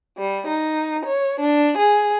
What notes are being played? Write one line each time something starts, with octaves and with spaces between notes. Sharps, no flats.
G3
D#4
C#5
D4
G#4